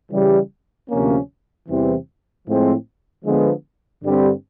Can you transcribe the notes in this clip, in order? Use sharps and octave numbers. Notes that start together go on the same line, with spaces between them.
C#3 E3 G3
D2 C3 F3 A#3 C#4
E2 C3 E3 G3 C4
A2 F3 G#3 C4
D3 F3 G#3 B3
G2 D3 G3 C4